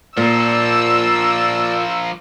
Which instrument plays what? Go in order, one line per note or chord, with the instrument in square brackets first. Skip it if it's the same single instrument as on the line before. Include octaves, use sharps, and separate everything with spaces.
[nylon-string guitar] A#2 [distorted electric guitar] F3 A#3 [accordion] D5 [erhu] E6